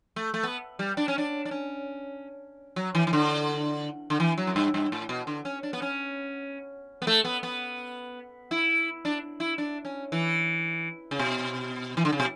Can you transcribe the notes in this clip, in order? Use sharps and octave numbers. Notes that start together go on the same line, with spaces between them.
A3
A3
B3
G3
D4
C#4
D4
D4
C#4
F#3
E3
E3
D3
D3
E3
F#3
F#2
G2
G2
A2
B2
D3
C#4
D4
B3
C#4
B3
A3
B3
B3
E4
D4
E4
D4
C#4
E3
C#3
B2
E3
D3
C#3
B2